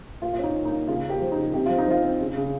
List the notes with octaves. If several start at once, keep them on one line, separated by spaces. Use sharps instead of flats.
A#2 F4
F4
C#4 D#4
A#2
D#4
A#3
C#3 F4
A#3
G4
F3
D#4
C#3
C3 G4
F3 F4
D#4
F3 F4
C4
C#3
C#3